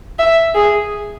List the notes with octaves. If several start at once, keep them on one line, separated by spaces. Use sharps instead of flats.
E5
G#4